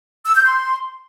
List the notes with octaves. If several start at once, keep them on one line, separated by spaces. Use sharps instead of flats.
E6
G6
C6